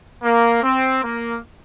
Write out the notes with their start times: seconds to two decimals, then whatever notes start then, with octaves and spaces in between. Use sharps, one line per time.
0.24 A#3
0.63 C4
1.02 A#3